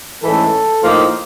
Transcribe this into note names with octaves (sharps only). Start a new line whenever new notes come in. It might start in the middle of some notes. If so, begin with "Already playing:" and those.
G#2 E3 A3 C#4 A4
A2 F3 A#3 D#4